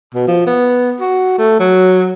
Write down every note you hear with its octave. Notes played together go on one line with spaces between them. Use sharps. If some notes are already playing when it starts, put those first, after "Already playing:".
B2
F3
B3
F#4
A3
F#3